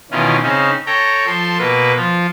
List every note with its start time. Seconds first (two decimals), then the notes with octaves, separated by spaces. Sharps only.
0.11 B2 D#3 E3 C#4 F4
0.43 C#3 C4 C#4 D#4
0.86 A4 C#5 G5 A#5
1.26 F3 A4 C6
1.59 B2 A#3 B4
1.97 F3 F4